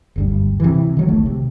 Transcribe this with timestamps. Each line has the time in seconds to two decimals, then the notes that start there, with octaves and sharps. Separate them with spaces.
0.16 F#1 D2 G2
0.60 C3 E3
0.97 D#3 F#3
1.08 E1 B1 D#3 A3
1.26 C3